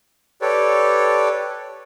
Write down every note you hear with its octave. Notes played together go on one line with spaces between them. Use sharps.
G4 A4 B4 C#5 D5